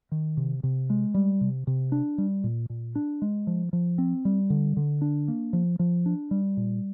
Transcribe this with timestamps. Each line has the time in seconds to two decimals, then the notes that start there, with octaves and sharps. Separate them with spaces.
0.12 D#3
0.37 C3
0.63 C3
0.90 G#3
1.14 G3
1.41 C3
1.67 C3
1.92 D4
2.18 G3
2.44 A#2
2.70 A#2
2.95 D4
3.22 G#3
3.47 F3
3.73 F3
3.98 C4
4.25 G3
4.50 D3
4.77 D3
5.01 D4
5.28 A#3
5.53 F3
5.79 F3
6.06 D4
6.31 G3
6.57 A#2